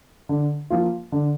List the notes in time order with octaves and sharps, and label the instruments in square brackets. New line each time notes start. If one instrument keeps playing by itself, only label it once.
[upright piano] D3
F3 A#3 F4
D3